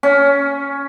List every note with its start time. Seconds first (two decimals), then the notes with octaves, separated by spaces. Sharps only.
0.03 C#4